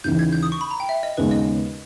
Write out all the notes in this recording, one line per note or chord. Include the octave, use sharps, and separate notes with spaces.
D#2 C#3 E3 G6
G#6
G6
D#6
C#6
B5
A#5
G5
E5
D#5
D#2 C#3 G#3 B3 B4
D#5